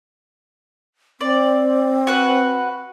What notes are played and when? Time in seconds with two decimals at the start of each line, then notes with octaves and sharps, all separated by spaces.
1.21 C4 D5
2.07 F#4 B4 F#5